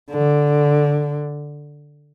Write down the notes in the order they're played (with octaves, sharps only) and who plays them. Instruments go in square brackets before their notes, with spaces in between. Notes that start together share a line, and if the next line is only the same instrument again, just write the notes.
[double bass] D3